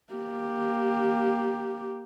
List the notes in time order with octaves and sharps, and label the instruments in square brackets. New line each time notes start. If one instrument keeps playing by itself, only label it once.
[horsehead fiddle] A#3 G4